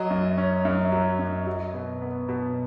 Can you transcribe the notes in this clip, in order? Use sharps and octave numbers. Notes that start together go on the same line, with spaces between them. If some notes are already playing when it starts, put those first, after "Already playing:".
Already playing: F#3 D#5
F#2
C#4
F#2
F#3
F#2
F#3
B2
B3
B2